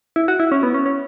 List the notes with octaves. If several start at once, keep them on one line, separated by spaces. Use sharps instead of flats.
E4
F#4
E4
C#4
B3
C#4
C#4